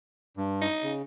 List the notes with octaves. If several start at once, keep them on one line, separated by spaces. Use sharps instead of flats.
G2
D#4
C#3